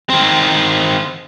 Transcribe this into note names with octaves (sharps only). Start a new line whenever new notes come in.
D#3 C4